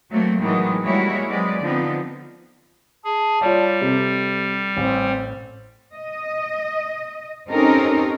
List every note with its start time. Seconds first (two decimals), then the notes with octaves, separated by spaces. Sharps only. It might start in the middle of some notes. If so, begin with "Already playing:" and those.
0.11 F#3 A3 A#3 C4
0.41 A2 D#3 E3 F#3 G#3 B3
0.85 G3 G#3 A#3 E4 F#4 C#5
1.29 F#3 G#3 C4 B4 D5
1.61 D3 F3 B3 C4 D#4
3.04 G#4 A5
3.41 G3 F4 C#5 D5
3.81 C3 A4
4.77 A1 C4
5.95 D#5
7.49 C4 C#4 D#4 G4 A4 A#4